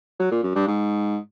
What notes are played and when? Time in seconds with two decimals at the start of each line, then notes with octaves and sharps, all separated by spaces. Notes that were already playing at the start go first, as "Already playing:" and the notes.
0.20 F#3
0.32 A#2
0.43 F#2
0.55 G2
0.67 G#2